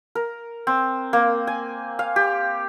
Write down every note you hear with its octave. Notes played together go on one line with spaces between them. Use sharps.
A#4
C4
A#3
G#5
F5
G4